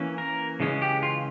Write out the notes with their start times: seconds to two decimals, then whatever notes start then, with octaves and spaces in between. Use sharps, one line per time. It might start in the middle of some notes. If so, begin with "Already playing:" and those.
Already playing: E3 A#3 C#4
0.18 A#4
0.60 C#3 E3 G#3 C#4
0.82 G4
1.03 F4